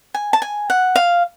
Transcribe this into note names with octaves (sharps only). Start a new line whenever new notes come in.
G#5
A5
G#5
F#5
F5